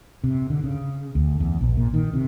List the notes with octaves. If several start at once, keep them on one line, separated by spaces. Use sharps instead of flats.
C3
D3
C#3
D2
E2
A#1
A#2
D#3
C3